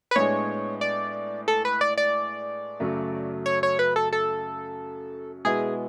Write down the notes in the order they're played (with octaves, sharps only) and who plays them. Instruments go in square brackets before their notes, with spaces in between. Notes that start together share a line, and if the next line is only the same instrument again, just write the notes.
[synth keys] B4
[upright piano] A2 G#3 B3 D4 G#4 [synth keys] C#5
[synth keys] D5
A4
B4
D5
D5
[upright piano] F#2 C#3 F#3 A3
[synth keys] C#5
C#5
B4
A4
A4
[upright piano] B2 G#3 B3 E4 [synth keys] G#4